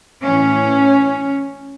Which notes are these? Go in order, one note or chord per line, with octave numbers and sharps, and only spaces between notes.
A2 E3 C#4